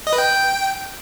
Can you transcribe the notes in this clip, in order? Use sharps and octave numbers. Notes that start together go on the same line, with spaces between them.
D#5
B4
G5